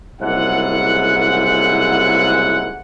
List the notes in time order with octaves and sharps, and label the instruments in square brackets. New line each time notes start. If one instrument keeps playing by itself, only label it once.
[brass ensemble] F#1 C2 G#2 E4 F#5